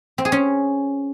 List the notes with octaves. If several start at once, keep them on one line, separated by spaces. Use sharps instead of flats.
C4
G#4
C#4